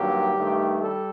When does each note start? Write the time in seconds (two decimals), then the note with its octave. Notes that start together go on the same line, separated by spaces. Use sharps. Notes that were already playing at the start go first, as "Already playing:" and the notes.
Already playing: G2 D#3 F#3 A#3 G4
0.35 G2 D#3 A3
0.81 G3 A4